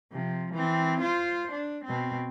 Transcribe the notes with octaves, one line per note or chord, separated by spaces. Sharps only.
C3 F3
E3 C4
F4 C5
D4
B2 C4